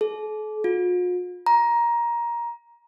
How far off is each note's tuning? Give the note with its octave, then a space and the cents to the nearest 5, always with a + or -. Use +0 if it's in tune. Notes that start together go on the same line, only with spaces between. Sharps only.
A4 -45
F4 +45
A#5 +15